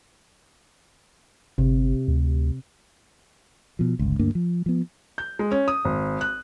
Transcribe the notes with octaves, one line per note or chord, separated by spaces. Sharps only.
G1 C3
D2
B2 F3
G1 C#2
D2 G2 A#3 D4
F3
F3 B3
G6
G#3
C#4
D#6
G#1
F#6